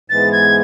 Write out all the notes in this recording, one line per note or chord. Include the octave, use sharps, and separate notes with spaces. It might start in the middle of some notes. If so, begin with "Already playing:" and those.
G#2 E3 G#3 B3 A6
G#6